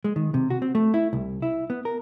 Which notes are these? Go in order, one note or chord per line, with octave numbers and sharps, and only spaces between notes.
G#3
D#3
C3
F#4
C4
A3
E4
C2
E4
B3
A#4